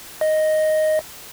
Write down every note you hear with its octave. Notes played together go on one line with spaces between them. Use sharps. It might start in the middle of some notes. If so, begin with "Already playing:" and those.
D#5